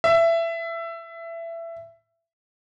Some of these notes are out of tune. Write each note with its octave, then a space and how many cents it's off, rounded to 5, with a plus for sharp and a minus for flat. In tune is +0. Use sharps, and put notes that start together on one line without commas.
E5 +20